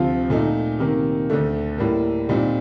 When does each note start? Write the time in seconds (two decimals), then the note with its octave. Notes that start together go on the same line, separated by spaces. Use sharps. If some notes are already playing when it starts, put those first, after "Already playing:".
Already playing: D2 C3 F3 C4 F4
0.30 A#2 A3 D#4
0.79 C3 D#3 A#3
1.30 D2 D3 A3
1.78 A2 G3 A#3
2.29 A#2 G3 C4 D#4